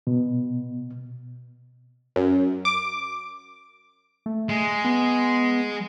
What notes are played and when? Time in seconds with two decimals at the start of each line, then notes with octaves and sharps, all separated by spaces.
0.07 B2
2.16 F#2
2.65 D6
4.26 A3
4.49 G#3
4.85 B3